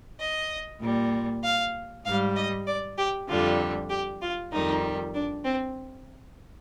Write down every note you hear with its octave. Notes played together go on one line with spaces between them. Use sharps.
D#5
A#2 G3
F5
G#2 G3 F5
D#5
D5
G4
F2 D3 G3 F4
G4
F4
F2 D#3 G3 D#4
D4
C4